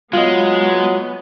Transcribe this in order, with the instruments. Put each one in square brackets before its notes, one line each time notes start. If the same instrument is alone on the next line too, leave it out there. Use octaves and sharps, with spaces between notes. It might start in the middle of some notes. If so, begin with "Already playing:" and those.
[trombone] F#3 [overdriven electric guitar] G#3 [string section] B3 [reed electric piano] F4 D#5